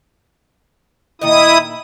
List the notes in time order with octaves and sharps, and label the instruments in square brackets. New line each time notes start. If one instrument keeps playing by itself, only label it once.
[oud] A#2 D#3 D#5 [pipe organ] E4 D#6